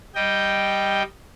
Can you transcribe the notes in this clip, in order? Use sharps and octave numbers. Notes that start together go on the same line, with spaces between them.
G3 D#5 G5